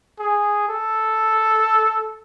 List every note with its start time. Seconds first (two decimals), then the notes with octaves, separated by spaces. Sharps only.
0.19 G#4
0.69 A4